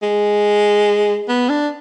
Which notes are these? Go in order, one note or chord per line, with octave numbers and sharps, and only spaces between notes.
G#3
B3
D4